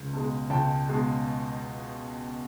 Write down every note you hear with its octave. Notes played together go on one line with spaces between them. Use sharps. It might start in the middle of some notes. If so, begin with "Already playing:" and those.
Already playing: C#2
B2 G#3
C#2 G5 A5
B2 G#3